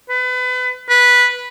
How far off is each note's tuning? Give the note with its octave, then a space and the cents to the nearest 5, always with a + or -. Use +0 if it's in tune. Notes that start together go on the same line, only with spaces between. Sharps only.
B4 +30
B4 -10